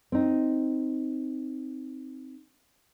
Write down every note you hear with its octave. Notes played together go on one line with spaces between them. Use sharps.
C4 D#4